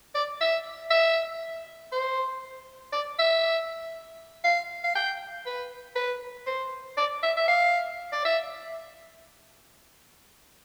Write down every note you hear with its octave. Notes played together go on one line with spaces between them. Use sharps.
D5
E5
E5
C5
D5
E5
F5
F5
G5
B4
B4
C5
D5
E5
E5
F5
D5
E5